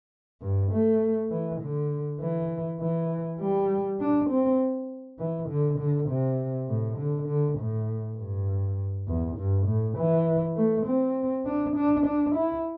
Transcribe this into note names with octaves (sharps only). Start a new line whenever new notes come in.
G2
A3
E3
D3
E3
E3
G3
D4
C4
E3
D3
D3
C3
A2
D3
D3
A2
G2
E2
G2
A2
E3
A3
C4
D4
D4
D4
E4